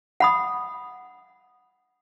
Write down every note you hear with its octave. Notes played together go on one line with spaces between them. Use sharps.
F#5 B5 D#6